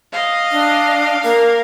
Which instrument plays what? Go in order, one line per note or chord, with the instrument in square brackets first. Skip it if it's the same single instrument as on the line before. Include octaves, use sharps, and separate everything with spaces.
[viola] D#5 [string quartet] F5
[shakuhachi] D4
[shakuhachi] A#3 [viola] A#4